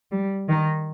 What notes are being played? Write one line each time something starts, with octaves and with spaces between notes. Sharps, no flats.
G3
D#3